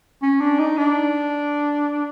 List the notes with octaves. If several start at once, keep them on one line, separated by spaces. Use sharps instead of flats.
C#4
D4
D#4
D4